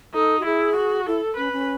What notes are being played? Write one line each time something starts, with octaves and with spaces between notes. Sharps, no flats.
D#4 A4
F#4
E4 G#4
F#4
E4 A4
C#4 B4
C#4